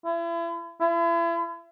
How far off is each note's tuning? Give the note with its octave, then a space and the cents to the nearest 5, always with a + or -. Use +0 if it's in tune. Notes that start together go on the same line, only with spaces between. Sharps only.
E4 +40
E4 +40